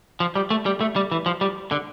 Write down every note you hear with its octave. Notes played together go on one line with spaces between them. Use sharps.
F3
G3
A3
G3
A3
G3
E3
F3
G3
D3